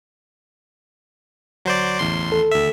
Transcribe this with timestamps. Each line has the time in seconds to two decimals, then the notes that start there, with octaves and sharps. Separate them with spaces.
1.65 D2 F#3 C5 D5
1.99 A1 E2 C6
2.29 D#2 A4
2.51 D2 E5